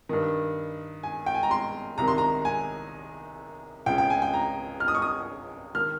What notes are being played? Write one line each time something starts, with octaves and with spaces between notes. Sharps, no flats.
G2 D#3
G#5
G5
G#5
A#5
C6
C2 C3 D#3 A#5
C6
A#5
G#5
C#2 C#3 G5
G5
G#5
G5
A#5
F6
D#6
C#6
D#6
D#3 F6